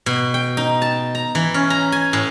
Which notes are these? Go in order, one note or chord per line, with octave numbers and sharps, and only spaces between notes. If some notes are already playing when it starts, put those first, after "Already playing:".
B2
G5
D#4
A5
A#5
E3
C#4
A#5
G#5
A2